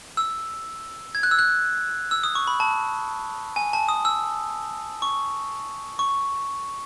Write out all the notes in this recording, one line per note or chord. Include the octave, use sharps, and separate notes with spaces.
E6
G#6
F#6
E6
F#6
E6
D#6
C#6
B5
A5
G#5
A5
D#6
E6
C#6
C#6